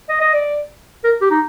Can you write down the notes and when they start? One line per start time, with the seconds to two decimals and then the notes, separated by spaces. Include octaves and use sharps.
0.09 D#5
0.21 D#5
0.33 D5
1.04 A#4
1.21 G4
1.31 D#4